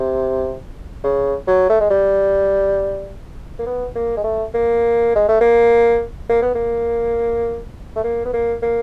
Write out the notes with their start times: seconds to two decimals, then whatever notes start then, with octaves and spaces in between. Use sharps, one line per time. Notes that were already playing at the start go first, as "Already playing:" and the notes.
Already playing: C3
1.04 C#3
1.47 F#3
1.69 A3
1.80 G#3
1.90 G3
3.59 A#3
3.66 B3
3.95 A#3
4.17 G#3
4.24 A3
4.54 A#3
5.15 G#3
5.28 A3
5.41 A#3
6.29 A#3
6.42 B3
6.55 A#3
7.96 A3
8.04 A#3
8.25 B3
8.33 A#3
8.62 A#3